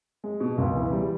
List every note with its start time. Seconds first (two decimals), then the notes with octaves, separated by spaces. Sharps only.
0.24 G#3
0.40 B2
0.58 C#2
0.75 E3
0.92 G3